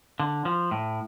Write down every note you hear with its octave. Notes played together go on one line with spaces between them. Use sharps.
D3
F3
A2